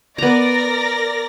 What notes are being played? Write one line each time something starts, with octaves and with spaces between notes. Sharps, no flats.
B3 A#4 D5 A#5 A#6